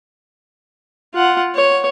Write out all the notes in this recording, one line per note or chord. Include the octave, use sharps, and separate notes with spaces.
F4 F#5
C#5